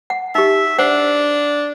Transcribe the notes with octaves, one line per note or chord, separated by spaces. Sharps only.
F#5
D#4 G4 E5
D4 C5 F#5